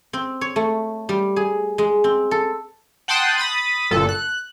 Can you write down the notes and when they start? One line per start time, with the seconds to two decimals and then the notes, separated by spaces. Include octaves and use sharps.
0.13 C4
0.41 C#5
0.56 A3
1.09 G3
1.36 G#4
1.78 G#3
2.04 C4
2.31 A4
3.08 F#5 G5 A5 C6 D#6 F#6
3.38 B5 D#6 A6
3.91 G1 A#2 A4
4.09 F#6